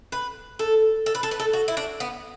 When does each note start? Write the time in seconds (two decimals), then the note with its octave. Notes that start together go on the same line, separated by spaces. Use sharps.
0.12 B4
0.59 A4
1.06 A4
1.15 B4
1.23 A4
1.31 B4
1.40 A4
1.53 F#4
1.68 E4
1.77 D4
2.00 B3